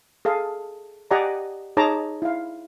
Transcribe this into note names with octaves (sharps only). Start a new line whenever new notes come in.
G#4 A4 F5
G4 D5 D#5 F#5 G#5 A#5
D#4 G#4 C#5 A5 A#5 D6
E4 F5